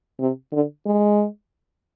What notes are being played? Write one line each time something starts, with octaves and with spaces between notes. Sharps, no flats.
C3
D3
G#3